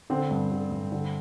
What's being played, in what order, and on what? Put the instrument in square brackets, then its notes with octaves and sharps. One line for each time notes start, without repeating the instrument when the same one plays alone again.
[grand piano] D3 C4
G2
D3
G2
D3